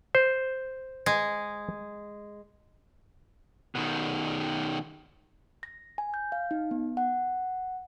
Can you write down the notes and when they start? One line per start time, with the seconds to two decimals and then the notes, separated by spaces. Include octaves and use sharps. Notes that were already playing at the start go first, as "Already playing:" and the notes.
0.15 C5
1.06 G#3
3.75 B2 D#3
5.63 A#6
5.98 G#5
6.14 G6
6.32 F5
6.51 D#4
6.71 B3
6.97 F#5